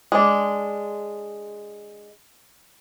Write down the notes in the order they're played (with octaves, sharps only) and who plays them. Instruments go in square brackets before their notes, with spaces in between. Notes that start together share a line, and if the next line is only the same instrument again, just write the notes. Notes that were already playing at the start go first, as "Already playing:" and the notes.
[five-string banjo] G#3 D4